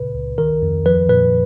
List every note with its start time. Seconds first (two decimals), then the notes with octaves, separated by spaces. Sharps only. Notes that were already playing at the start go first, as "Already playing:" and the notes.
Already playing: A#2 C#3 B4
0.15 C#2
0.38 D#3 A#4
0.62 F2
0.86 F3 B4
1.09 A#2 B4